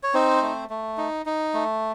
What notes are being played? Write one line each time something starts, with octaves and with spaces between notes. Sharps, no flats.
C#5
C4 D#4 C5
A3
A3
D#4
D#4
A3